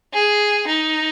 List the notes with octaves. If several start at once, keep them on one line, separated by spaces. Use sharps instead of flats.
G#4
D#4